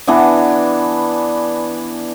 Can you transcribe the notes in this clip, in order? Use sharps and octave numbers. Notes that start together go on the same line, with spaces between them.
E3 B3 D4